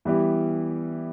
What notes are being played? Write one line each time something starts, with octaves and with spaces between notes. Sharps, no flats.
E3 G3 B3 E4 G4